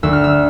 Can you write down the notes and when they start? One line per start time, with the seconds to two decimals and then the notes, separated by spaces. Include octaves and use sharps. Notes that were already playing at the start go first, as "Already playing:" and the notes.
0.03 D2 E6
0.13 F6
0.24 E6